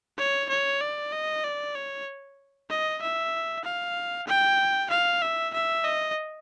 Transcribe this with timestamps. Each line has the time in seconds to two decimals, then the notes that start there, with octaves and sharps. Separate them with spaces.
0.18 C#5
0.49 C#5
0.81 D5
1.12 D#5
1.44 D5
1.75 C#5
2.69 D#5
3.02 E5
3.64 F5
4.27 G5
4.90 F5
5.22 E5
5.53 E5
5.84 D#5